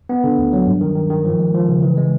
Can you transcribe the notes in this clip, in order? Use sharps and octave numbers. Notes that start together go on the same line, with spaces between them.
B3
D3
D2
F#3
G2
D#3
D#3
D#3
F3
G#3
F3
C#3
E3
G#3